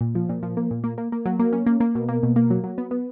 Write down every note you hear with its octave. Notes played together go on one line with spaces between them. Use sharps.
A#2
F3
A#2
F3
A#3
A#2
A#3
A#3
A#3
F#3
A#3
C#4
A#3
A#3
B2
A#3
B2
A#3
F#3
F#3
B3
B3